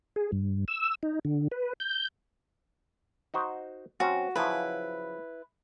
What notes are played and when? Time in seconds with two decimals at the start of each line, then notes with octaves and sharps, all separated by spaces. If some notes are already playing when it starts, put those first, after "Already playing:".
0.16 G#4
0.32 G2
0.68 E6
1.03 D#4
1.25 D3
1.51 B4
1.80 G6
3.34 D#4 F#4 C5
4.00 F#3 C4 C#4 F#4
4.36 C#3 F3 F#3 E4 B4